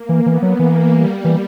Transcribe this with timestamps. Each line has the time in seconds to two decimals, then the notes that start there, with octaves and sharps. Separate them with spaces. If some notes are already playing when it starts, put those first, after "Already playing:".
Already playing: A#3
0.09 E3
0.25 E3 B3
0.42 F#3
0.58 E3 A#3
0.92 G3
1.25 E3